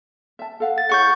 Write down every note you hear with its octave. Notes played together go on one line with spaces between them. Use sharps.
E5 A5
A4 F5 F#5
A6
E4 G#4 C#5 F#5 C#6 G6